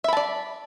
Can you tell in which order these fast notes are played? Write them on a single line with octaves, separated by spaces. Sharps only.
E5 B5 A5 D5